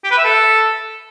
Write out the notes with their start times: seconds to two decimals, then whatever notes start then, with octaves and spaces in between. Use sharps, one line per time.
0.04 G4
0.11 B4
0.18 E5
0.25 A4